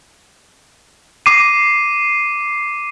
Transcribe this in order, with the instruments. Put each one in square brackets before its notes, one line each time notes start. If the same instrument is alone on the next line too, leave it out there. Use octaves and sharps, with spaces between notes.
[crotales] D6 C7 D#7